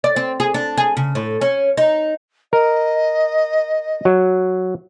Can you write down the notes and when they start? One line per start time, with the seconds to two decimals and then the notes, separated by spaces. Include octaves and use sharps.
0.04 D5
0.16 C4
0.40 G#4
0.54 D4
0.78 G#4
0.97 C#3
1.15 A2
1.41 C#4
1.77 D#4
2.53 A#4 D#5
4.05 F#3